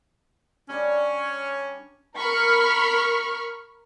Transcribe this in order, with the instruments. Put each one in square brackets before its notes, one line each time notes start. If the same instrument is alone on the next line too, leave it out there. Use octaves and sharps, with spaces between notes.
[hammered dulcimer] G3 D4 [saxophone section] C#4
[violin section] A#4 B5 C#6 F6 C#7